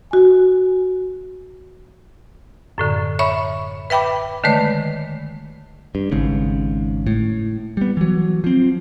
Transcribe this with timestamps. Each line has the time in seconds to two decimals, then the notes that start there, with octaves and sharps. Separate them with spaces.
0.11 F#4 G#5
2.78 F#2 A2 D3
3.19 C#5 E5 B5 C#6
3.90 B4 E5 G5 B5 D6
4.44 D3 D#3 G#3 A3 B4 C#5
5.95 G2
6.11 G#1 G#2 C#3
7.07 A2
7.77 G3 B3
7.97 E3 F#3
8.44 F3 C4